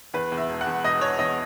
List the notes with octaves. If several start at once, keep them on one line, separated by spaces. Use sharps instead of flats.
E2 B4
E2
E5
E1
F#5
E2
E1 D#5
E1 C#5
E2 D#5